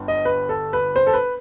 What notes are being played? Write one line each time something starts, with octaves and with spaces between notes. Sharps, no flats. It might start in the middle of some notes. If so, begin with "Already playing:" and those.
Already playing: G1 G2
D#5
B4
A4
B4
C5
A4
B4